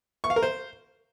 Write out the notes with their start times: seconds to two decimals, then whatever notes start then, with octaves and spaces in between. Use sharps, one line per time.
0.24 C#6
0.30 F5
0.36 A#4
0.43 C5